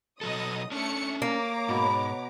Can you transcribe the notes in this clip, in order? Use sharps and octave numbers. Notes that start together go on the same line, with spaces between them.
B2 F#3 A4 D#5 D#6
A3 C#4 D4 C#7
A#3 C#5 A#5 D6
G#2 B2 B4